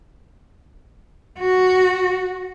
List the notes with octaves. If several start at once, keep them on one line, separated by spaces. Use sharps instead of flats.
F#4